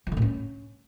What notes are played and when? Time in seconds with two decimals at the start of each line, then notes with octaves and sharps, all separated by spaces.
0.07 F3
0.12 D3
0.17 A2
0.22 C#4